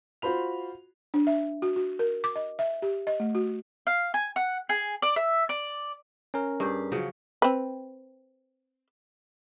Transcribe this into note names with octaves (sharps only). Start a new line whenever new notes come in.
F4 F#4 C5 B5 F7
D4
E5
F#4
F#4
A#4
D6
D#5
E5
G4
D#5
A3
F#4
F5
G#5
F#5
G#4
D5
E5
D5
C#4 A#4
G2 G4 G#4
C#3 F3 F#3
C4 B4